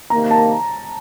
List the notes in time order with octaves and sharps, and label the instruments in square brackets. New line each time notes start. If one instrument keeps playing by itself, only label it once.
[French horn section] C3 D#3 A#3 [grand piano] A#5
[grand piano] A5